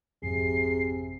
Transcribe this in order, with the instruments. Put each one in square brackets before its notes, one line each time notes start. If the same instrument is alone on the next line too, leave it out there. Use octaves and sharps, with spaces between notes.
[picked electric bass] G#1 F2 [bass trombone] C3 [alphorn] G#4 [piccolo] C7